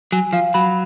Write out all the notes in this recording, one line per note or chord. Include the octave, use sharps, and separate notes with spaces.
F#3 G#5
F3 F5
F#3 B5